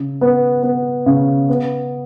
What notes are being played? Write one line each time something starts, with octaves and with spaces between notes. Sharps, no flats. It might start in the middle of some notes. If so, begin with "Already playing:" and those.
Already playing: C#3
B3
B3
C#3
B3